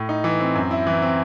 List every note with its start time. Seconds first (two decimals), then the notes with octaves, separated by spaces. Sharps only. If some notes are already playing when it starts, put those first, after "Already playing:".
Already playing: A2
0.09 D#4
0.24 E3
0.40 C4
0.55 F#2
0.71 E4
0.87 E3
1.02 C4